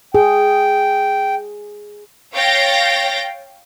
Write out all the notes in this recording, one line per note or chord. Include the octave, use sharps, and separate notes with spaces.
G#4 G5
C#5 F5 G5 G6 A6 A#6